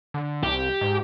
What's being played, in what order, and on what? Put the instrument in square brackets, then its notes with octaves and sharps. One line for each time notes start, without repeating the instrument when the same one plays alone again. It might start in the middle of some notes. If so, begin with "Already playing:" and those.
[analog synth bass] D3
[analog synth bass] C2 [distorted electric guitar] G4
[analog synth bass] G#2